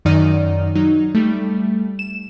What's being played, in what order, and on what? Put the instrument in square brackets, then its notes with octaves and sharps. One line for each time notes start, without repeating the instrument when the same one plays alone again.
[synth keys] F#2 D#3 D#4 D5 F6 D#7
F#3 D#4
G3 A3
E7